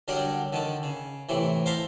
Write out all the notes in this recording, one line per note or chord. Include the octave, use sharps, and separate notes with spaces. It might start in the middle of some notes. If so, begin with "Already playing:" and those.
D3 F#3 G3 D4 G4 A#4
D3 D#3 A5
C#3
A2 C3 E3
C5 E5 F5 A5 A#5 C6